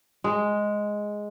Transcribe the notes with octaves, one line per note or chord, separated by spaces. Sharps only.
G#3